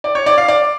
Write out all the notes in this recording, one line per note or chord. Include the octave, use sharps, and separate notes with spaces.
D5
C#5
D5
F5
D5